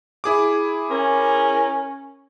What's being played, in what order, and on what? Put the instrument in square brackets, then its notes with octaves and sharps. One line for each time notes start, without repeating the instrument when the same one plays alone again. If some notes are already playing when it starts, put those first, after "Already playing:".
[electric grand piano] E4 G#4 D6
[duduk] C#4 [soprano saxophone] A#4